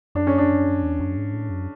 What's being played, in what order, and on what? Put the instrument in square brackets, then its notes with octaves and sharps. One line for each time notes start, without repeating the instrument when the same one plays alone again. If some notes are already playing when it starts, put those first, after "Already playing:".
[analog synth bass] F#2 [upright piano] D4
[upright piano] C#4
D4
[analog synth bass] E2
F#2
G#2
A2
F#2